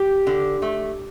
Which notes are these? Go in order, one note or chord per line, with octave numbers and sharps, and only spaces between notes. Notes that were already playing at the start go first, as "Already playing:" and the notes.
Already playing: G4
D3
A3